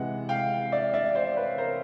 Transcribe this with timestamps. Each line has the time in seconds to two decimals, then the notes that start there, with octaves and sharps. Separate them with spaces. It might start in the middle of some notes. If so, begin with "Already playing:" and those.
Already playing: C3 E3 G#3 E5 F#5
0.29 F5 G5
0.72 D5 E5
0.94 D5 E5
1.15 C5 D5
1.37 B4 C#5
1.58 A#4 C5